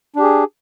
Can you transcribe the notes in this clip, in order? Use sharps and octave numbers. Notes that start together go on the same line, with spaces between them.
D4 G4 G#4